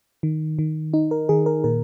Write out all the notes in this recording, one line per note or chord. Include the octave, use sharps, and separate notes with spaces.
D#3
D#3
D#4
A#4
D#3 G#4
A#4
A#2 A#4